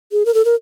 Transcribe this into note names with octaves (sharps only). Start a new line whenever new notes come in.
G#4
A#4
A4
A#4